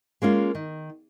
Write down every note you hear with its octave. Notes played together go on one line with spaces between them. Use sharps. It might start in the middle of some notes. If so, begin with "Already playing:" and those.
G#3 A#3 C#4 F4
D#3